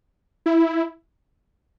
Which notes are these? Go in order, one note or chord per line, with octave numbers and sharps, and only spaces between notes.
E4